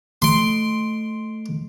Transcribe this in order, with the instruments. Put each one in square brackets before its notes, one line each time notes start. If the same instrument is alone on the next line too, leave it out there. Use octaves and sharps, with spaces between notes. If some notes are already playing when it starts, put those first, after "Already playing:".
[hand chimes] A3 D7 [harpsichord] C6